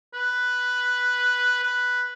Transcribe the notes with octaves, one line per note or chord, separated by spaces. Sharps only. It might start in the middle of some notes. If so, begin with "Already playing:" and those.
B4
B4